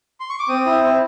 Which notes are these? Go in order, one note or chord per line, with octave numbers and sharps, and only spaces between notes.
C6
C#6
D6
C4 D#6
E4
C4